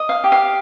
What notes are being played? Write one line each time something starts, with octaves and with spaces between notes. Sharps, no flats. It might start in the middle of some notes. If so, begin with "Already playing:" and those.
Already playing: D#5
F5
G4
F5